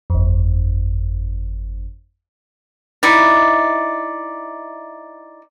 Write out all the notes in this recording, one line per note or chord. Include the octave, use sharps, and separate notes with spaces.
G1 F2
D#4 E4 D5